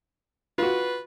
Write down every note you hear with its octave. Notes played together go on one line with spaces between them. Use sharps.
F4 F#4 B4